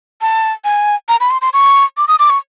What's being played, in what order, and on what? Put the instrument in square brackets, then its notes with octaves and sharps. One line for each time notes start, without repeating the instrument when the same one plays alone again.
[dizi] A5
G#5
A#5
B5
C6
C6
C#6
D6
D#6
D6
C#6